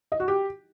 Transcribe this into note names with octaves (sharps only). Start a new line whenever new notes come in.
D#5
F#4
G4